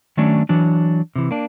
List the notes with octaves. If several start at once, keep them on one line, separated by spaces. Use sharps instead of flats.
D#3 F#3 A3 C#4 D4
E3 F#3 D4
C3 E3
A#3 D4